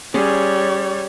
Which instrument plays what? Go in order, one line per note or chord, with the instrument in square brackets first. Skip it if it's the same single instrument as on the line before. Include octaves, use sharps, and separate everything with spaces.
[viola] G3 C#5 [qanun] C#4 G#4 C6